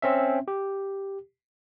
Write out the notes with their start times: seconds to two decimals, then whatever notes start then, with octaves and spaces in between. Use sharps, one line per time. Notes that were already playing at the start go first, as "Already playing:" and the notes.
0.02 C4 C#4 E5
0.48 G4